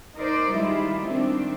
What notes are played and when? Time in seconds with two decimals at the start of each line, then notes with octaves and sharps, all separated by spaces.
0.16 D#4 A#4 C5 D5
0.53 D#3 G3 G#3 E4 F4
1.07 D#3 C4 D4